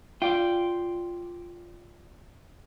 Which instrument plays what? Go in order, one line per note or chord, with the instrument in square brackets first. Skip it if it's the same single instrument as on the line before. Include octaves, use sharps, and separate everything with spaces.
[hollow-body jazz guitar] F4 [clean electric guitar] D5 G5